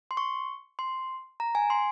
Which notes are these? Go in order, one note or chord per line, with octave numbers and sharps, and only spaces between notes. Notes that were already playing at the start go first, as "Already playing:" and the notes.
C6
C#6
C6
A#5
G#5
C6